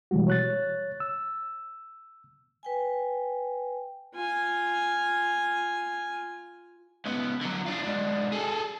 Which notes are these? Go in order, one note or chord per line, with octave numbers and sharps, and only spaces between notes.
B2 E3 G3 G#3 F#4
C#5 F#6 A6
E6
B4 G5 G#5
F4 G#5
C#2 B3
D3 F#3
D4 F4
G#2 D4
G#4 A4